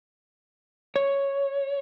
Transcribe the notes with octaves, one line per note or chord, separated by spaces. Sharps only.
C#5